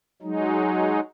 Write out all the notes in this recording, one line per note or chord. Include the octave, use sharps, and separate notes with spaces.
F#3 G#3 D#4